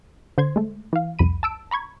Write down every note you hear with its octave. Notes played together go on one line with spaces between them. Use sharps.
D3 C5 C6 G#6
G#3 A3
E3 F5
C2 F2 B5 D#7
A5 E6 D7
A#5 B5 C#6 G#6